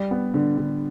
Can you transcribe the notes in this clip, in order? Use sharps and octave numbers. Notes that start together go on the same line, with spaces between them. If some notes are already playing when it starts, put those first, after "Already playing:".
Already playing: G3
B3
D3
D3